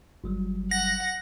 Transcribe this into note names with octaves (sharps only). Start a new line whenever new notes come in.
G1 F#3 G3
F#5 A#6